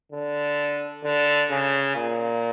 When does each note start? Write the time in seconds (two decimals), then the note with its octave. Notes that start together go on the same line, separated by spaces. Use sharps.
0.12 D3
1.03 D3
1.50 C#3
1.95 A#2